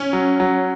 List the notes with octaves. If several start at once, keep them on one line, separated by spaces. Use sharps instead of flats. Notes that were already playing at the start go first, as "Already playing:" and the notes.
Already playing: C#4
F#3
F#3